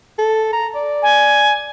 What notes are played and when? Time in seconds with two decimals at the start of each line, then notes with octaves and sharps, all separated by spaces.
0.19 A4
0.53 A#5
0.75 D5
1.03 G#5